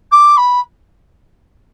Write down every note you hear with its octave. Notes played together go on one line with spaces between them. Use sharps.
D6
B5